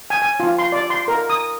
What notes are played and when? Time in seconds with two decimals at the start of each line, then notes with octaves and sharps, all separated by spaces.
0.10 G#5
0.22 G#5
0.40 F4
0.59 C6
0.72 D5
0.90 C6
1.08 A#4
1.30 D#6